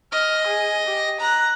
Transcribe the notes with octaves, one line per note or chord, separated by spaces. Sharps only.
D#5 F6
G#4
G4
A#5 F#6